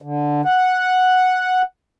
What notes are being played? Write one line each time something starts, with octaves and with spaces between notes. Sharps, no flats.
D3
F#5